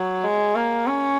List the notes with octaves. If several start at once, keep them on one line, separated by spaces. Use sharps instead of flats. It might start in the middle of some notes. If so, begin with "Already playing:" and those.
Already playing: F#3
G#3
A#3
C#4